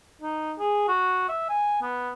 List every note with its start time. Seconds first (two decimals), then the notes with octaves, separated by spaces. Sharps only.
0.22 D#4
0.59 G#4
0.88 F#4
1.29 E5
1.49 G#5
1.82 B3